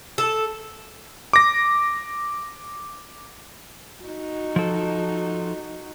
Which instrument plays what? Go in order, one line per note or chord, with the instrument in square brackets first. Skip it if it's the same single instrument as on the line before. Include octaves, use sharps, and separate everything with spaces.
[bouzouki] A4
[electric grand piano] D6 A#6
[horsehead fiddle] D#4 F#4
[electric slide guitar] F3 A4